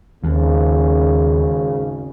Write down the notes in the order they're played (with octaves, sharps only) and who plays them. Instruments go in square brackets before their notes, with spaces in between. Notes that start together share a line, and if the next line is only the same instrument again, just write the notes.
[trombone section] G#1 G#2 C#3 [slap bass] D#2